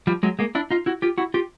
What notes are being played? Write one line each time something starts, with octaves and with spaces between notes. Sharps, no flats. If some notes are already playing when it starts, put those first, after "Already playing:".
F3 G3
F#3 G#3
G#3 A#3
D4 E4
D#4 F4
E4 F#4
F4 G4
E4 F#4
F4 G4